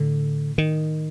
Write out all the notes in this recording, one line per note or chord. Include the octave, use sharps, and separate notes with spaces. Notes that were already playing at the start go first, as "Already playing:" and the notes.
Already playing: A2 D3
D#3